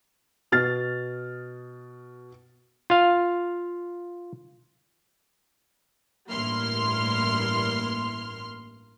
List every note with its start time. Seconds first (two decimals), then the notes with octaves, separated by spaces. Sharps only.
0.52 B2 F6 A6
2.90 F4 F5
6.30 A1 G2 A#3 E4 C6 F6